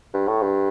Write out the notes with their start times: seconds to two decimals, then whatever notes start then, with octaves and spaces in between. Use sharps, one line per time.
0.14 G2
0.27 A2
0.42 G2